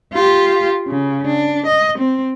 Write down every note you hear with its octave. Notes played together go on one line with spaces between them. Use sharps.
F4 G4
C#3
D4
D#5
C4